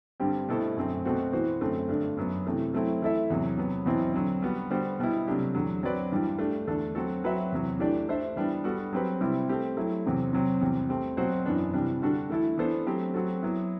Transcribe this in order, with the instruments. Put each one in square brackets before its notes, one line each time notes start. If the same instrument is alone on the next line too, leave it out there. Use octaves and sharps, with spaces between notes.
[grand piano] G2 D3 G3 C4 G4
B2 A3 E4 A4 C5
F#2 D3 F#3 A3 C4
B2 A3 C4 F#4
E3 B3 F#4 C5
F#2 D3 A3 C4
G2 D3 A3 D4
F#2 F#3 B3
C3 E3 A3 E4
F#3 A3 C4 E4
E3 A3 E4 A4 E5
E2 C3 F#3
C3 F#3 B3
E2 B2 F#3 C4 E4
D3 F#3 C4
G3 B3 F#4
D3 G3 B3 F#4 C5
B2 G3 B3 E4
C3 F#3 A3 D4 G4
E2 D3 F#3
F#3 C4 F#4 B4 D5
G2 E3 G3
A3 D4 G4
E2 D3 A3 D4 A4
F#3 C4 F#4 A4
F#3 C4 F#4 B4 E5
E2 C3 F#3
E3 A3 D4 G4 D5
A3 D4 A4 C5 E5
E3 G3 B3 D4
G3 B3 F#4 A4
F#3 C4 G4 B4
C3 G3 C4 E4
A3 C4 G4
F#3 A3 E4
E2 C3 F#3 C4
C3 F#3 C4
E2 C3 G3
A3 C4 G4
B2 F#3 C4 F#4 C5
F#2 E3 B3 D4
C3 E3 G3 D4
D3 G3 D4 F#4 A4
E3 A3 E4 A4
E3 B3 D4 A4 C5
F#3 A3 C4 G4
F#3 C4 F#4 A4
F#3 B3 E4